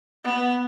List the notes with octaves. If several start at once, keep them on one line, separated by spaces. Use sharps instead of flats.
B3